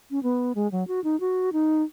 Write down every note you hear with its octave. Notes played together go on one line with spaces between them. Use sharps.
C#4
B3
G#3
F#3
F#4
D#4
F#4
D#4